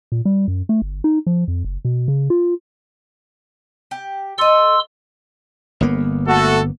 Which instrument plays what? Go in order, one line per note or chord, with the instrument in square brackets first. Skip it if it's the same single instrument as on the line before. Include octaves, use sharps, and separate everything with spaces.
[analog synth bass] A#2
G3
F#2
A3
G1
D#4
F3
F2
F#1
B2
C#3
F4
[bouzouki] G4
[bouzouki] A4 D#5 [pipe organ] C6 E6
[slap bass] G1 A#3 B3
[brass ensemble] A3 F#4 A4